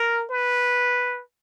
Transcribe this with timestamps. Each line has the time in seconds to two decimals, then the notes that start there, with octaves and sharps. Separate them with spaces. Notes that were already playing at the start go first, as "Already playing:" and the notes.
Already playing: A#4
0.31 B4